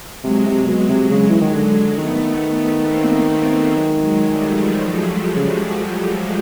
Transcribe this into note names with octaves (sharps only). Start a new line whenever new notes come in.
C3 F#3 G#3
C3
B2
C3
C#3
E3
D#3
D3
D#3 A3 B3
A#3 C4
F#3 G#3
F#3 G#3
G3 A3
F3 G3
C#3